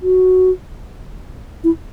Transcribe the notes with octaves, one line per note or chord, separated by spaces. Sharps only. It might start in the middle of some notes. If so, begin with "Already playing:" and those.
F#4
E4